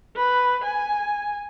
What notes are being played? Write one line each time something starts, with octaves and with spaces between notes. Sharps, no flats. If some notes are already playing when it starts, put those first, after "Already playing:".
B4
G#5